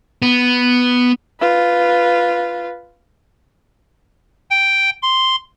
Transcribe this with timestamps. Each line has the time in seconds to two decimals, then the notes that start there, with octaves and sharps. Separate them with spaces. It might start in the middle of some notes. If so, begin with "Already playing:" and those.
0.22 B3
1.40 F4 B4
4.50 G5
5.02 C6